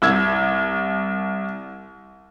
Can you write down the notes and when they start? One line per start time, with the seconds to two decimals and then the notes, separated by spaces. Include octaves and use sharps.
0.02 C2 E6 G#6